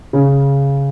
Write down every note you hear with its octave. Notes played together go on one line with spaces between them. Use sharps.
C#3